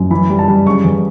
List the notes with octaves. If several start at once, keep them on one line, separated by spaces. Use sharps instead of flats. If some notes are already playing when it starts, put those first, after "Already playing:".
Already playing: F#2
E3 B5
G3
A5
G3
C#3 C#6
E2